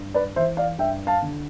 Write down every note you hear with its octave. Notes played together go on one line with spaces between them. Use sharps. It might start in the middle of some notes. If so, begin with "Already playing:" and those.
Already playing: G2
B4 D5
E3 C5 E5
D5 F5
G2 E5 G5
F5 A5
D3